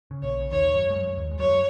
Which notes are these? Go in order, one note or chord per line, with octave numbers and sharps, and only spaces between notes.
C#3
A#1 A#2 C#5
C#3
D#2 D#3 C#5
F#2 F#3
G#3
F#2 F#3
D#2 D#3
G#3
F#2 F#3 C#5
F#3